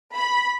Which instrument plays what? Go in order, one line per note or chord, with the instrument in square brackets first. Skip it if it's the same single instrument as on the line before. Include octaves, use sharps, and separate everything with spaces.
[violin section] B5